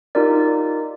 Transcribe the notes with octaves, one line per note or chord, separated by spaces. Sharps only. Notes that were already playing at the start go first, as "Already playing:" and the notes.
D#4 F4 G4 A#4 D5